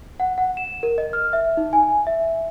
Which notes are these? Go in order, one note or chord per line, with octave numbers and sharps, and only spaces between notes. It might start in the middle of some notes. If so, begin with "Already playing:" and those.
F#5
F#5
E7
A#4
D#5
F6
E5
D#4
G#5
E5